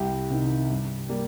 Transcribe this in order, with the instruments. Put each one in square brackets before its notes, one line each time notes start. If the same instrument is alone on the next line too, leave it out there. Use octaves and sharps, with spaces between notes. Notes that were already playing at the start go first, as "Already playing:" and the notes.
Already playing: [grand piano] C2 G4
C3 D#3
G2
G3 A#3